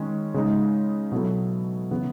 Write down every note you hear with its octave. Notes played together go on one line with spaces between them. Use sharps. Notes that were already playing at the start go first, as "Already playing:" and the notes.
Already playing: D#3 G#3 C#4
C#3 G#3 D#4
B2 F#3 B3 E4 A4
C#3 E3 B3